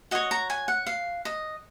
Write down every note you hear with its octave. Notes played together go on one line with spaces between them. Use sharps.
F#4 C#5 D#5
A#5
G#5
F#5
F5
D#5